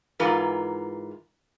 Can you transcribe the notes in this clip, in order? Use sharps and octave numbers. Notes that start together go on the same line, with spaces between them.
G#2 E3 F4 A#4 B4